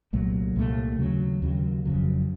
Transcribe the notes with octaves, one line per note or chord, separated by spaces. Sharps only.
C2 A#2 F#3 A3
C2 A#2 F#3 A3
D#2 C#3 F#3
D#2 C#3 F#3
F#1 F2 C#3 F#3